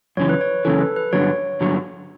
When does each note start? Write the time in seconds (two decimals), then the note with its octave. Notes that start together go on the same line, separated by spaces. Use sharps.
0.17 F#2 C#3 E3 C#5
0.29 B4
0.41 C#5
0.65 F#2 C#3 E3 A4
0.81 B4
0.96 B4
1.13 G2 D3 F#3 C#5
1.61 G2 D3 F#3